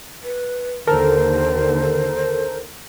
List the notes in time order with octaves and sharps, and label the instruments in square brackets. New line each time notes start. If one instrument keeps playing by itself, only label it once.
[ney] B4
[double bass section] D#2 D3 [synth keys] A4 A#4 [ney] C5